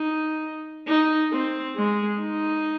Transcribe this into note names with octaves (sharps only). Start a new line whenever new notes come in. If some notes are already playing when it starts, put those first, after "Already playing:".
Already playing: D#4
D#4
C4
G#3
D#4